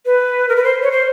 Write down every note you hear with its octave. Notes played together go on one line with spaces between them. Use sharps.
B4
A#4
B4
C5
C#5
C5